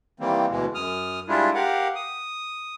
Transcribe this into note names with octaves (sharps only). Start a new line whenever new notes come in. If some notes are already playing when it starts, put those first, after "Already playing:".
D#3 E3 G3 A#3 C4
D2 B2 E3 G#3
F#2 D#6 F6
G3 G#3 D4 E4 F4
G4 A#4 F5 F#5
D#6